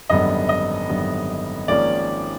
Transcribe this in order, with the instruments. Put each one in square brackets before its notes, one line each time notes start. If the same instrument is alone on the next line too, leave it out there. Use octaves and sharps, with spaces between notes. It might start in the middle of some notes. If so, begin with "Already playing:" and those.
[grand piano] G#1 F#2 D3 G3 B3 D#5
D#5
G#1 F#2 D3 G3 B3
G#1 G#2 F3 A#3 C#4 D5